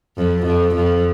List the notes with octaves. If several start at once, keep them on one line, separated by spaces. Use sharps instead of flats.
F2
F2
F2